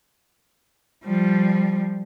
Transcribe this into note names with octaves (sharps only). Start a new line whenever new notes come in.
F3 G3